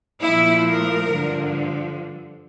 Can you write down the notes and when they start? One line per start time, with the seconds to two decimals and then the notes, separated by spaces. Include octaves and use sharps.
0.24 A#2 F3 A3 E4
0.68 A#4
1.12 G2 D3 F3